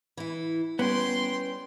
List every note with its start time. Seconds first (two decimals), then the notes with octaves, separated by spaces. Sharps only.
0.17 E3 E4
0.79 G3 B3 C#4 G5 C6